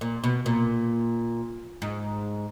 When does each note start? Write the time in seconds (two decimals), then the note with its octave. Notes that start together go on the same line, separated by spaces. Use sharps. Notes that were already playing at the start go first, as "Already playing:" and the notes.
0.01 A#2
0.24 B2
0.46 A#2
1.82 G#2